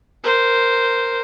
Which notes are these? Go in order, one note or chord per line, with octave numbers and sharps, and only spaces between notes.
A#4 C5